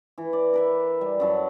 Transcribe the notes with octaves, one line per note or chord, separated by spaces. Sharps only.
E3
D5
A#4 B4 E5
G3
F#2 F#3 A5